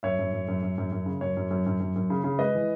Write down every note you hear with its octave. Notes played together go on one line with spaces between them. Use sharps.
F#2 C#5 E5
F#2
F#2
F#2
F#2
F#2
F#2
C#3
F#2 C#5
F#2
F#2
F#2
F#2
F#2
C#3
C#3
G#3 B4 D#5
E3